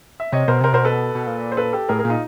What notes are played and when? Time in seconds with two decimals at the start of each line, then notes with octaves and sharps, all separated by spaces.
0.20 E5
0.32 C3 C#5 D#5
0.48 B2 A#4 C5
0.61 C3 A#4 C5
0.72 B2 A#4 C5
0.85 A4 B4
1.15 B2
1.27 A#2
1.52 C5
1.57 A4 B4
1.73 G4 A4
1.88 A2 G#4 A#4
1.99 G#4 A#4
2.05 A#2
2.10 D#4 F4